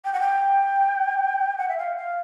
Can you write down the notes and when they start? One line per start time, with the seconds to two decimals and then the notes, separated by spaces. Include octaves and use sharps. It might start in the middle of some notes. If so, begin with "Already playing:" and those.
0.05 G5
0.13 F#5
0.20 G5
1.58 F#5
1.69 E5
1.78 F5
1.97 F5